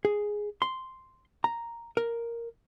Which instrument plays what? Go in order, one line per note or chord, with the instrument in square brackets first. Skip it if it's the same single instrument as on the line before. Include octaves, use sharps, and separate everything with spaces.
[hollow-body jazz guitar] G#4
C6
A#5
A#4